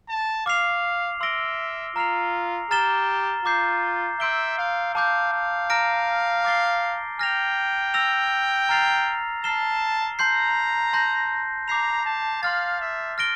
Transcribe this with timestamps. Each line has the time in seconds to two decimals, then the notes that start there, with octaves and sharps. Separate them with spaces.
0.09 A5
0.46 F5 D6 F6 C7 F7
1.21 E5 C6 E6 A#6 D7 G7
1.96 F4 A#5 F6 C7 F7
2.71 G4 A#5 F6 A6 E7 G7
3.45 F4 A#5 D6 G6 C7
4.20 E5 C6 E6 G6 D7 G7
4.58 F5
4.94 F5 A5 D6 G6
5.33 F5
5.70 A#5 F6 A#6 D7
6.45 D6 A6 C7 G7
7.19 G5 F6 A#6 F7
7.94 E6 A#6 F7
8.69 A#5 F6 A6 C7 F7
9.43 A5 F6 C7 E7 G7
10.19 A5 A#5 C6 G6 C7
10.93 A5 C6 G6 A#6
11.68 A#5 D6 G6 C7 F7
12.05 A5
12.43 F5 C6 F6 A6
12.81 E5
13.18 F6 A#6 D7 G7